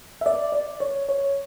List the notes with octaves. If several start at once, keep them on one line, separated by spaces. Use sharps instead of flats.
E5
D5
D5
C#5
C#5